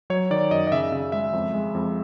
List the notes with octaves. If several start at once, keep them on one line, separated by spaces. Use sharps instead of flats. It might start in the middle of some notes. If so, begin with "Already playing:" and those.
F#3 C#5
D#3 D5
F#2 D#5
D#5
C#3 E5
C#3 E5
G#3 E5
F2
G#3
F2